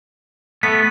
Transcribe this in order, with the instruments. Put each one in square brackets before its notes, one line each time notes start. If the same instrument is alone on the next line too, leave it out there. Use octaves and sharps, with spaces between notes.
[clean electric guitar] A3 B3 [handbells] B6